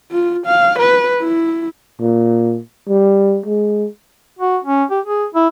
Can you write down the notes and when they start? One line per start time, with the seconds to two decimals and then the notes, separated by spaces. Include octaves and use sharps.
0.12 F4
0.47 F5
0.79 B4
1.21 E4
2.01 A#2
2.89 G3
3.46 G#3
4.39 F#4
4.64 C#4
4.90 G4
5.06 G#4
5.35 E4